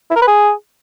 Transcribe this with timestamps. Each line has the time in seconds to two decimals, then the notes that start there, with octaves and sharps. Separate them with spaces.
0.10 E4
0.16 A#4
0.22 B4
0.27 G#4